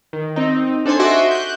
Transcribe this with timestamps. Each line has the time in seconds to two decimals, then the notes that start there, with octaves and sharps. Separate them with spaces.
0.13 D#3
0.36 C4 D#4
0.85 D4 A4 C5 G#5 C6
0.99 F#4 D#5 E5 C6 D6
1.31 F#6 G6